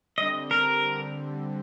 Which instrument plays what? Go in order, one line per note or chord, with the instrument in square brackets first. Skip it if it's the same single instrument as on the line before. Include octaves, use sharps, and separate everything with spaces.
[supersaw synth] D3 G3 C4 [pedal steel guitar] D#5
[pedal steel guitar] A#4